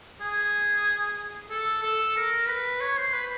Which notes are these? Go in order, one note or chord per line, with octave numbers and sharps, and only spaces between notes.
G#4
A4
A4
A#4
B4
C#5
C5
B4